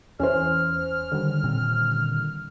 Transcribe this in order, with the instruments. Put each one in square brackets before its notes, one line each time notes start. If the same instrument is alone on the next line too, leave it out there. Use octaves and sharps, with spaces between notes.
[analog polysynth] E2 E3 [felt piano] C#4 C5 [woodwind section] F6
[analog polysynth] D3 D#3 G3
[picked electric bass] A#2 C4